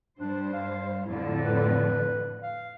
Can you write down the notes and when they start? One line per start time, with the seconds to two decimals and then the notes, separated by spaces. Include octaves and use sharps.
0.19 G2 D4 C5
0.53 F5
1.06 F2 A2 D3 E4
1.45 B4
2.42 F5